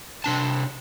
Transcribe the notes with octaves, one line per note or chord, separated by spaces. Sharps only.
C3 D4 A5